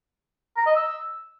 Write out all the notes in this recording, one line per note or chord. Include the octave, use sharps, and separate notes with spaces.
A#5
D#5
E6